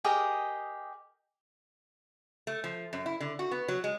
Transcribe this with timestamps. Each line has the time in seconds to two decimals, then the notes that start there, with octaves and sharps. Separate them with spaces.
0.04 G4 G#4 A#4 D#5
2.47 A3
2.64 F3
2.93 F#2
3.06 E4
3.20 D3
3.39 F#4
3.51 B3
3.68 F#3
3.84 G#3